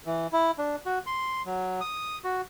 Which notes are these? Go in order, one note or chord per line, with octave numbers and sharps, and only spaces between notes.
E3
E4
D4
F#4
C6
F#3
D#6
F#4